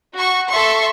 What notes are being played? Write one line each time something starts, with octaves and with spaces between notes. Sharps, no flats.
F#4 C#6
A4 E5 C6 C#6